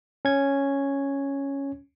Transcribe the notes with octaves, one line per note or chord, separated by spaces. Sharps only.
C#4 G#6